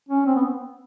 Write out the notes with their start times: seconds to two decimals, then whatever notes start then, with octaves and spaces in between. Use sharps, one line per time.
0.09 C#4
0.26 C4
0.36 B3